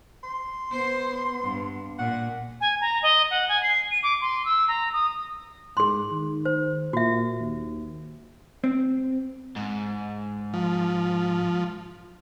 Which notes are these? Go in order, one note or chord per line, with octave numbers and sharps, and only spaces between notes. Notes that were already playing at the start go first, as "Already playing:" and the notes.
C6
B3 C5
G2
A#2 F#5
G#5
A#5
D#5
F#5
G#5
C7
D#7
D6
C6
E6
A#5
D#6
G#2 G#4 C6
D#3
C5
A#2 F#4 E5
D#2
C4
G#2
F3